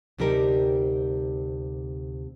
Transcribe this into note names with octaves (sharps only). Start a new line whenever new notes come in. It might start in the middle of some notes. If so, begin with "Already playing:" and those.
D2 C3 G3 D#4 G4 A#4